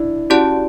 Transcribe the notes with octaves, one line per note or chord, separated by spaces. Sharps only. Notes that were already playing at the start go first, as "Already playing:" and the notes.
Already playing: D4 E4
C#4 E4 F#4 G4 D5 A5